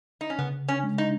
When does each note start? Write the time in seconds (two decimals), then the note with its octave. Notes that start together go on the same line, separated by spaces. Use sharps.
0.21 D#4
0.30 C#4
0.39 C#3 B3
0.69 C#4
0.83 G#3
0.98 D#4